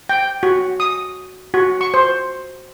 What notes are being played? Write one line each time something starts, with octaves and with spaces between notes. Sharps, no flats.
G5
F#4
D#6
F#4
C#6
C5